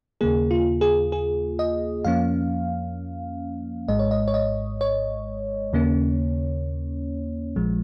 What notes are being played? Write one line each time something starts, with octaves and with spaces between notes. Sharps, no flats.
D#2 C#3 A#3 G#4
F4
G#4
G#4
D#5
F2 F3 A#3 C#4 F5
G#1 G#2 G#3 D#5
C#5
D#5
C#5
D#5
C#5
D#2 C#3 A#3 C#4
A#1 A#2 F3 G#3